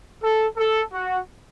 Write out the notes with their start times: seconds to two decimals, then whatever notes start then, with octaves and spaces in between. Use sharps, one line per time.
0.22 A4
0.57 A4
0.93 F#4